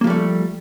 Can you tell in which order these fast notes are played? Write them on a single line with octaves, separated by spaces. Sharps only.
A#3 F3 G3 A3